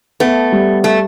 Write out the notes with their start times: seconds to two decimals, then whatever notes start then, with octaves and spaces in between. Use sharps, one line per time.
0.20 A3 B3
0.52 G3
0.84 A3